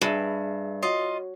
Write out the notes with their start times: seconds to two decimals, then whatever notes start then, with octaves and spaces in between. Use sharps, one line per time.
0.01 G2 G#4 E5
0.83 F4 F#4 C#5 D#5